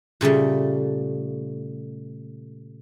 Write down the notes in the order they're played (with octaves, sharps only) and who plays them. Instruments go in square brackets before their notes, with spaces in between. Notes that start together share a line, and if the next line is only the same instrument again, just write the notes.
[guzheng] A#2 C#3 G3 A3